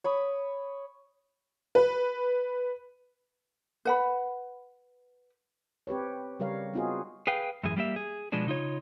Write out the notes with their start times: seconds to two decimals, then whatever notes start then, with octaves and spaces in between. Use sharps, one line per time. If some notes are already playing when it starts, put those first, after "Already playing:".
0.04 C#5 B5 D#6
1.75 B4
3.85 B4 F#5 B5
5.87 C4 G4 B4 C#5
6.39 C#3 G3 A#4 C#5 F5
6.73 B3 C4 D#4 F4 F#4 G#4
7.27 G#4 B4 F5 G5
7.63 F#2 A2 E3 G#4
7.76 G3 A#3 G4 E5
7.96 G#4
8.32 B2 F3 G#3 B3 D4
8.47 C#3 D#4 F4 C#5